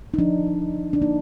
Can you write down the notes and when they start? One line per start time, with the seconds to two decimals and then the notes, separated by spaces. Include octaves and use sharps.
0.14 D#4
0.18 F3 D4
0.47 F3
0.74 F3
0.93 D4
1.02 A#3 D#4